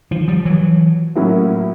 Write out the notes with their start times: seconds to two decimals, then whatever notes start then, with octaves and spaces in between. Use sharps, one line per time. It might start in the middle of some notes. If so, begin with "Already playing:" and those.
0.11 D#3 F3
0.28 F3 G3
0.45 E3 F#3
1.16 A2 F#3 A#3 C#4 E4